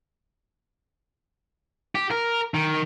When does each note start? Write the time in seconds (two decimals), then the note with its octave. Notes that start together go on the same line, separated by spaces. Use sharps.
1.95 G4
2.11 A#4
2.54 D#3